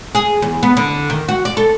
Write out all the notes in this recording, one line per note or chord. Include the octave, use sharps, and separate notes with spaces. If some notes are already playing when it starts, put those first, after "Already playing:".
G#4
E2
B3
D3
D#3
F#4
D5
A4